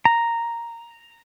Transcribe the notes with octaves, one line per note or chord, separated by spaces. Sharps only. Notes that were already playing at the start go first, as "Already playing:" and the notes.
A#5